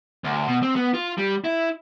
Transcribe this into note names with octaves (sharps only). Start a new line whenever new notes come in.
D2
B2
C4
B3
F4
G3
E4